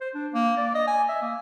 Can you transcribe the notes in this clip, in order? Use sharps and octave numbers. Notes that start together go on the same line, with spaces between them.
C5
D4
A#3
D5
D#5
G#5
E5
A#3